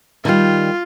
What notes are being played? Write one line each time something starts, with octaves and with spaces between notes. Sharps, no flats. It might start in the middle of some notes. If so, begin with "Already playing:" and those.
D#3 G3 F4